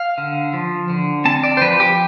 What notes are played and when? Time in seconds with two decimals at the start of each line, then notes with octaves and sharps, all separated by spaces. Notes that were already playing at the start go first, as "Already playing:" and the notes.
Already playing: F5
0.18 D3
0.53 F3
0.90 D3
1.25 C4 A5
1.43 D5
1.57 C5
1.61 F3 B4
1.80 G4